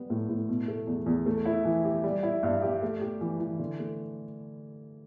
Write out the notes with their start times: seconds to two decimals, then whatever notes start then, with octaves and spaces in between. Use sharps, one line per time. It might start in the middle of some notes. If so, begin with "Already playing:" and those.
Already playing: G3 B3
0.10 A2
0.29 A2
0.49 B2
0.68 A3
0.87 E2
1.06 E2
1.26 A3
1.46 E4
1.65 E3
1.85 G4
2.04 G3
2.23 E4
2.43 G2
2.62 G4
2.82 A3
3.01 G4
3.21 E3
3.40 E3
3.59 D3
3.79 A3